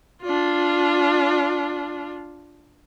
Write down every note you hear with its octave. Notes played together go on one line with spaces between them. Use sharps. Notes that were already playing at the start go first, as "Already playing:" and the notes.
D4 F4